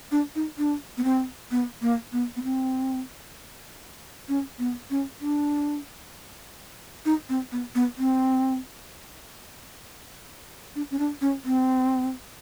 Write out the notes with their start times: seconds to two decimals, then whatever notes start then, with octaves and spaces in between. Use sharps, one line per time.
0.12 D4
0.35 D#4
0.58 D4
0.97 B3
1.04 C4
1.51 B3
1.82 A#3
2.13 B3
2.36 B3
2.43 C4
4.29 C#4
4.59 B3
4.90 C#4
5.21 D4
7.06 D#4
7.29 C4
7.52 B3
7.75 B3
7.98 C4
10.76 D4
10.91 C#4
10.99 D4
11.21 C#4
11.45 C4